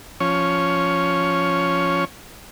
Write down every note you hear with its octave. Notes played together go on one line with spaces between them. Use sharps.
F3 C#4 C#5